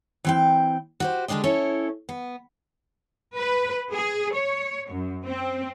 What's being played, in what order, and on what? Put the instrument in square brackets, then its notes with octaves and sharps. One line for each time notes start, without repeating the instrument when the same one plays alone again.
[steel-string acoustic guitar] E3 C4 G5
F#4 G4 C5
D3 G#3 D4 G4 D#5
C#4 E4 A4 C#5
B3
[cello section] B4
G#4
C#5
F#2
C4